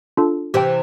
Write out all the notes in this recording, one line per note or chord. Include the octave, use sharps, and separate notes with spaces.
D4 F4 A4
C3 E3 G4 C5 G5